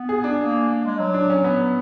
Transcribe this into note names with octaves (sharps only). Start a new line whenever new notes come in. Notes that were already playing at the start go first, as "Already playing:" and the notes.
Already playing: B3
G#4
D4
A#3
A#3
G#3
F#3
D4
C#4
B3
F#3